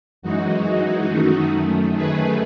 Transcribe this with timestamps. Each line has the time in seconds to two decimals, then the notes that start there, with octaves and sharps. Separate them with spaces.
0.22 F#2 E3 G#3 D#4 F#4
1.08 F#2 D#3 A3
1.95 F#2 D#3 A3 G#4 B4